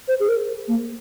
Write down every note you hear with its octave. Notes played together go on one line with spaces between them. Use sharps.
C5
G#4
A#4
A#3